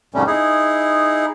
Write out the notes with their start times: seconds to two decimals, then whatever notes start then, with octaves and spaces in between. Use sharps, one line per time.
0.14 F2 G#2 C3 G3 A3 C#4
0.27 D#4 E4 G#4